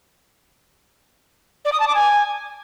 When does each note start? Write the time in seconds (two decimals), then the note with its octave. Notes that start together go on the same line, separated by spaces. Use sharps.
1.65 D5
1.72 D#6
1.80 A5
1.87 D6
1.95 G#5